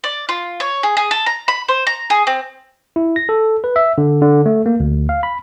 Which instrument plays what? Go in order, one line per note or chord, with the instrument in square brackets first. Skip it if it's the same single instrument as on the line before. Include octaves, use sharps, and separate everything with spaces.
[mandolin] D5
F4
C#5
G#4
G#4
A4
A#5
B5
C5
A#5
G#4
C4
[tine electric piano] E4
A#6
A4
B4
E5
D3
D3
A3
A#3
D2
F5
B5